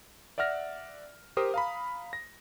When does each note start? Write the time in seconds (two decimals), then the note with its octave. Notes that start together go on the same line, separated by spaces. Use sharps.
0.38 D5 E5 F#5 F6 A#6
1.37 G4 A#4 C5 D#6
1.54 F5 A#5 B5
2.13 A#6